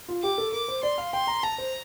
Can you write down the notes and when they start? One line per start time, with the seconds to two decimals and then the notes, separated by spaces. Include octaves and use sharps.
0.08 F4
0.22 G4 D6
0.38 A4
0.52 A#4 D6
0.68 C5
0.83 D5 C6
0.98 F5
1.12 G5 C6
1.27 A#5
1.43 A5 A#5
1.58 C5